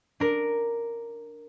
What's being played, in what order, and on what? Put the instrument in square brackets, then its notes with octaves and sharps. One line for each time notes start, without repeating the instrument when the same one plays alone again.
[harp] D4 A#4